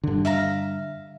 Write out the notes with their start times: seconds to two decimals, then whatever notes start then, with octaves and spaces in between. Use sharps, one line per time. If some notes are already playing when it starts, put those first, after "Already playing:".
0.04 G2 D3
0.25 E5 F5 A#5